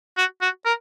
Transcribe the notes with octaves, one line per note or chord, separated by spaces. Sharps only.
F#4
F#4
A#4